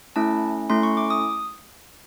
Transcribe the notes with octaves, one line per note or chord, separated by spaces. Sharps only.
A3 C#4 E4 A5
A3 C#4 E4 C6
C#6
D6
D#6